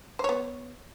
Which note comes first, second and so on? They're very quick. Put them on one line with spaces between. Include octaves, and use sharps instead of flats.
C5 C#5 B3